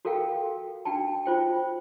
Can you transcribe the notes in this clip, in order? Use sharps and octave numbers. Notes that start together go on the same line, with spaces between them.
F#4 A4 A#4 F5 G5
D4 F#4 G5 A5
F4 C5 G5